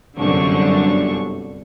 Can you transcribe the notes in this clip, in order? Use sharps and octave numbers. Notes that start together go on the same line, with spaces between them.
G1 C2 F#2 D3 D4 C#6